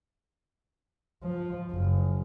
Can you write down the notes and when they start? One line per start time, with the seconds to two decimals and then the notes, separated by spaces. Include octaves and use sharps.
1.24 F3
1.72 F#1